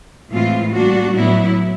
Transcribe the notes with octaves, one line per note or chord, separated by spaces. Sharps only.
A2 E3 G#3 C4 F4
G3 A#3 D4 F#4
A2 F#3 B3 E4